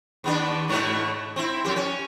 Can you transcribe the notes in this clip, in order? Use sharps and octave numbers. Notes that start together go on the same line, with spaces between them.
D#2 B3 D4
G#2 B2 A3
C4 E4
F2 G4
C#4